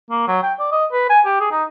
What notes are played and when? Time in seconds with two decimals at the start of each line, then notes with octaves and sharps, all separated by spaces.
0.11 A#3
0.28 F#3
0.43 G5
0.59 D5
0.72 D#5
0.92 B4
1.10 G#5
1.25 G4
1.40 G#4
1.52 D#4